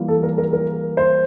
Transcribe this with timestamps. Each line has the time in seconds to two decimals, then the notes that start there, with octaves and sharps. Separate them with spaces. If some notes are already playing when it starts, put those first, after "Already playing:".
Already playing: E3 G3 A#3 F4
0.08 A4
0.23 A#4
0.38 A#4
0.53 A#4
0.97 C5